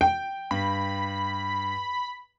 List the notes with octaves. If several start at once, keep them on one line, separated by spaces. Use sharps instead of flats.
G5
G2 B5